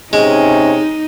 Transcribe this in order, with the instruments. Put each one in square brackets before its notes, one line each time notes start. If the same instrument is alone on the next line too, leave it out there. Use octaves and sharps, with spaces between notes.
[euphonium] C3 [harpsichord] G#3 [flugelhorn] C#4 [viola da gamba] D#4